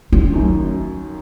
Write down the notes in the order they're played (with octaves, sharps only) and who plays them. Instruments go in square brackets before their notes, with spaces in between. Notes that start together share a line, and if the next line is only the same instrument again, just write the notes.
[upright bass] F4
[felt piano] F#2 D#3